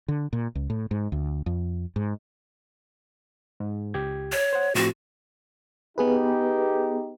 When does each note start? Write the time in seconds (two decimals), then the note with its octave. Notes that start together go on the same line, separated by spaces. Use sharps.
0.08 D3
0.33 A#2
0.55 C#2
0.70 A2
0.91 G#2
1.12 D2
1.46 F2
1.96 G#2
3.60 G#2
3.94 C#2 G4 G#6
4.32 C#5
4.53 C5 F#5
4.75 A2 F3 C4 F#4
5.98 B3 D#4 G4 G#4 B4